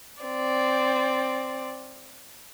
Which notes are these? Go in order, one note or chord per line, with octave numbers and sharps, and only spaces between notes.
C4 D5